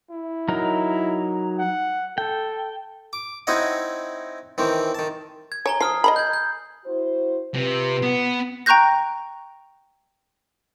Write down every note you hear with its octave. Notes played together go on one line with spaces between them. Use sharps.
E4
F#3 D#4 A#4
F#5
A4 G5
D6
C4 D#4 E4 C#5 D#5 F#5
D#3 E3 C4
D#3 A5
G#6
C#5 G#5 A#5 G7
F3 D#6 F6 C7
D#5 A#5 B5
G6 G#6
G6
E4 F#4 C5
C3 F4 B4
B3
G5 A#5 C#6 F#6 G6 A#6